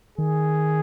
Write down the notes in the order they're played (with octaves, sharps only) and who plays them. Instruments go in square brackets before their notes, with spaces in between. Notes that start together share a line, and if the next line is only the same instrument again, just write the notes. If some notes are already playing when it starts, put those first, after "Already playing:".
[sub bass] D#3 [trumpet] G#4